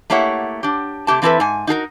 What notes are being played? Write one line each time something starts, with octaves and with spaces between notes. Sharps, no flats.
A3 A#3 E4 G4 C#5 F#5
D4 G4
C3 A3 G4 A5
E3 C4 E4 G#4 A4 B4
G#2 G#5
D#4 F#4 G#4 A#4